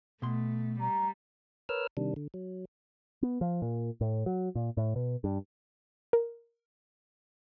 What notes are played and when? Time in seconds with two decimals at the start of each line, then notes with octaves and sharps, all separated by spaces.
0.22 B2 A3 C6
0.80 G3 A#5
1.69 A#4 B4 C#5 E6 F6
1.97 C3 D#3 G3 D4
2.16 D3
2.34 F#3
3.23 B3
3.41 F3
3.62 A#2
4.01 A2
4.26 F#3
4.55 A#2
4.77 A2
4.96 B2
5.24 G2
6.13 A#4